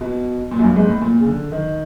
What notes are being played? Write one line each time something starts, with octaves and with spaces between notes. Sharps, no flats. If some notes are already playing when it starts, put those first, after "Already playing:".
B2
A#2
F#2
G2
G#2
A2
A#2
C#3
D3
D#3